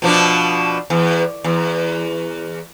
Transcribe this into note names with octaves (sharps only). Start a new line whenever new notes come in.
B2 F3 D4
E2
E2